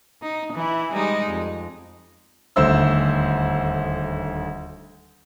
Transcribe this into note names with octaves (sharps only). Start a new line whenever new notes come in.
D#4
E3 E4
G3 G#3 D#4
F2
D#1 D2 C5 E5 E6